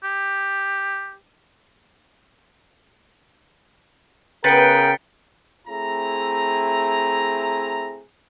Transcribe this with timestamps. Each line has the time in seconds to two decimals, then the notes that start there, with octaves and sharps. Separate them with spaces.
0.03 G4
4.44 C#3 B3 A#4 B4 G5 A6 B6 C#7
5.67 A3 C4 E4 G#4 A#5